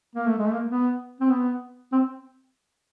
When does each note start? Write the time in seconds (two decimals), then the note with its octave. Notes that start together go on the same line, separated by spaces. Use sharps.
0.15 A#3
0.26 A3
0.38 G#3
0.47 A3
0.53 A#3
0.68 B3
1.20 C4
1.30 B3
1.92 C4